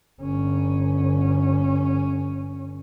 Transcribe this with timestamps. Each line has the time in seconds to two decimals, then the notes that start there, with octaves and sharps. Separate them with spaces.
0.21 G1 C#4